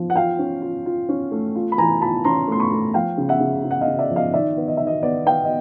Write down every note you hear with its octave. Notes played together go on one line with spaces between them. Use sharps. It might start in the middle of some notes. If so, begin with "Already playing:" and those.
Already playing: F3
F#5
F4 F5 G5
C#4
F4
F4
C#4
A3
F4
B5
E3 G#5 A#5
F4 A5 B5
C#4 A#5 C6
A3 C6
B5 C#6
A3
F3 F5 G5
C#3
E5 F#5
C#3
C#3
F#5
D#5 F5
C#3
D5 E5
F3
D#5 F5
D#3 D5 E5
B3
D#5
D#3 E5
D#5
B3 D5
B3 F5 G5
D#5